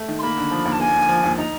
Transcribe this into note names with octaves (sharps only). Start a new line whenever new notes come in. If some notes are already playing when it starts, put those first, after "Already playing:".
Already playing: A3
D#3
C6
A#3 B5
D3
F3
D#2
A5
A#3 G#5
D3
F3
D#2
D#4 A#5